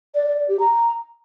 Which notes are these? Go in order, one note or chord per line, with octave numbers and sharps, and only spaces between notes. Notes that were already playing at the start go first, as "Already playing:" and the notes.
D5
D5
D5
G4
A#5